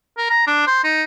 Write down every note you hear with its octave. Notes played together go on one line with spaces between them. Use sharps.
A#4
A#5
D4
C5
D#4